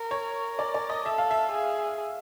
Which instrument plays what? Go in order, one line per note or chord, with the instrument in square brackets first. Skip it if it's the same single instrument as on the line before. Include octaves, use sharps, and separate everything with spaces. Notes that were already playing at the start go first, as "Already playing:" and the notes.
Already playing: [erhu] A#4
[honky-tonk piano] C#5
D5
D5
D#5
[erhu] A4 [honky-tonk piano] E5
[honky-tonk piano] F5
E5
[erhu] G#4